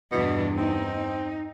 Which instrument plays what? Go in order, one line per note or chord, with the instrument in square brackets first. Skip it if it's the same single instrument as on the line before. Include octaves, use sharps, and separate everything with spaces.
[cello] E2 G2 [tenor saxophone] B2 [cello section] E3 D4
[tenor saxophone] C4 [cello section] D#4